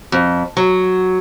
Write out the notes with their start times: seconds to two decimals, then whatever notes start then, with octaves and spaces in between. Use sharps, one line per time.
0.12 F2
0.57 F#3